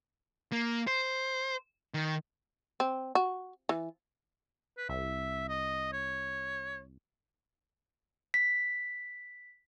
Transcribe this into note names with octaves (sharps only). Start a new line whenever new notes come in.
A#3
C5
D#3
C4
F#4
E3
B4
C2 E5
D#5
C#5
B6